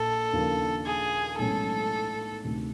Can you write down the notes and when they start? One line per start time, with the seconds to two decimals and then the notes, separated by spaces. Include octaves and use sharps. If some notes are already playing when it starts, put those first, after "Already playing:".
Already playing: A#1 A#2 A4
0.33 D#2 C#3 F3 A#3 D4
0.86 G#4
1.38 B1 A2 E3 G#3 C#4 A4
2.44 D2 C3 D#3